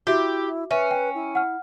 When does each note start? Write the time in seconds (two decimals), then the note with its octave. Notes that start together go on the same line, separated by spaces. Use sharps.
0.07 E4 F#4 G4 E5
0.71 C#4 B4 E5
0.91 G5
1.15 E4
1.35 F#5 F6